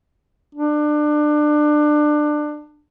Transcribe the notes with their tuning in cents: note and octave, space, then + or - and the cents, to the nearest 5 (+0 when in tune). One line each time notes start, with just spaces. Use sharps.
D4 +25